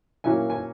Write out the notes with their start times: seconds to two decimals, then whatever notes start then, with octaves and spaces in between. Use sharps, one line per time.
0.24 A#2 F#3 A#3 C#4 E4 G#5
0.50 G#5